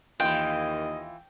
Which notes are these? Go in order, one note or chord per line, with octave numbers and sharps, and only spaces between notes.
D#2 E3 A#3 F4 D#5 G5